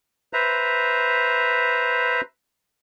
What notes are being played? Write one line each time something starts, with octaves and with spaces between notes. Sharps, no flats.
B4 C5 E5 A#5